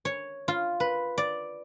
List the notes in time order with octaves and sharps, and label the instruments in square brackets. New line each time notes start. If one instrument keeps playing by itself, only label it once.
[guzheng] C#5
F4
B4
D5